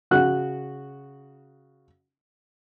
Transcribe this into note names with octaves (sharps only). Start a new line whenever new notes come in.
C#3 F#4 F#6